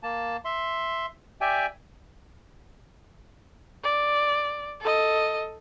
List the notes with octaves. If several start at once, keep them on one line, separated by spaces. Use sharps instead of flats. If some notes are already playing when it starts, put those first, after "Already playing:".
A#3 A5
E5 C6
G4 D5 E5 G5 G#5
D5
A4 D#5